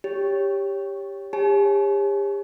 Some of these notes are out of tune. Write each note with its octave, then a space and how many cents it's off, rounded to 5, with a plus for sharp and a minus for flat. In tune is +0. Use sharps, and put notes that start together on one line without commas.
G4 +10 C#5 +5
G4 +40 C#5 -20 G#5 +45